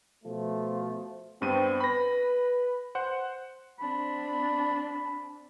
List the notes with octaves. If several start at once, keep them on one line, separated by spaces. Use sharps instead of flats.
B2 F3 A3
G2 B3 C4 D#7
B4 B5 A#6
C5 F#5
C4 D4 B5